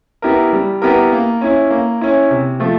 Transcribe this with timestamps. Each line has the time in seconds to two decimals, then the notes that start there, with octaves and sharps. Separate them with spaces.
0.22 B3 E4 G4 A#4
0.53 G3
0.82 B3 E4 G4 A#4
1.12 A#3
1.41 C#4 E4
1.70 A#3
2.01 C#4 E4
2.31 C3
2.60 F3 A3